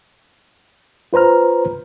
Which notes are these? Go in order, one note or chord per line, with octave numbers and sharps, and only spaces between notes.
F4 B4 C5 A#5 F6